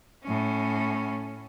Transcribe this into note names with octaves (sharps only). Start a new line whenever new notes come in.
A2 C#4